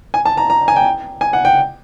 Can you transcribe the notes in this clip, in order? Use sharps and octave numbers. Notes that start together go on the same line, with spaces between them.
G#5
A5
A#5
A#5
G#5
G5
G#5
F#5
G5